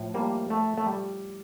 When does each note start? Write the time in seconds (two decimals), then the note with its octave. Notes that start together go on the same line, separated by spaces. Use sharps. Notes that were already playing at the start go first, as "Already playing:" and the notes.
Already playing: A2 F3
0.14 G3 A#3
0.50 A3
0.77 A3
0.87 G3